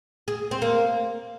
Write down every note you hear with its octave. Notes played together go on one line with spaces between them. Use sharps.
G#4
C4
A#3